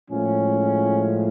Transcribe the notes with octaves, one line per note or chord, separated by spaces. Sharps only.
A2 F3 G#3 C#4